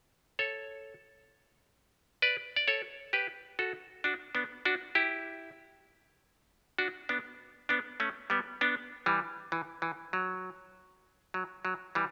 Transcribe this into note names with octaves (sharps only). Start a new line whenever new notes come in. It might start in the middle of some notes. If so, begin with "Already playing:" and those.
A4 C#5
B4 D5
D5
A4 C#5
G4 B4
F#4 A4
D4 F#4
B3 D4
D4 F#4
E4 G4
D4 F#4
B3 D4
B3 D4
A3 C#4
G3 B3
B3 D4
E3 G3
E3
E3
F#3
F#3
F#3
E3 G3